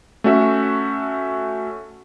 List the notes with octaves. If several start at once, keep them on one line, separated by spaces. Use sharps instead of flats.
A3 C#4 F#4 E5